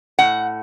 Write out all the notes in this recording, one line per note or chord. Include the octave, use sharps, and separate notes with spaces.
A2 F#5